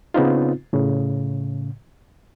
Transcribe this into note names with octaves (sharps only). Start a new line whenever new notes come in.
C#3 B3 C4 D#4 F4
A2 C#3